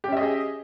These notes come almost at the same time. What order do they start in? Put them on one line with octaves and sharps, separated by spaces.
G4 C#4 E5 D#5 G#4